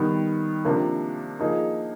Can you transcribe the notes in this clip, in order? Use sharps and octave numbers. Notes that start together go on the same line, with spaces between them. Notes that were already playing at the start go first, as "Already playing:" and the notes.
Already playing: D#3 G3 B3
C3 F3 A#3 D4
F3 A#3 D#4 G#4